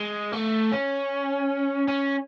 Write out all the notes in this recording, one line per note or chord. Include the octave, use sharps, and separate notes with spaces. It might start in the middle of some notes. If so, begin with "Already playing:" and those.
Already playing: G#3
A3
C#4
C#4